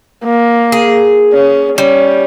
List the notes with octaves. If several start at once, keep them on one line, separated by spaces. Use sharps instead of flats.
A#3
G#4
C#4
G3 C#4